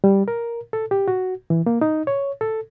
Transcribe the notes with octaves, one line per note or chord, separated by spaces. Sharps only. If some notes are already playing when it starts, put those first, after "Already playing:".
G3
A#4
A4
G4
F#4
E3
A#3
D#4
C#5
A4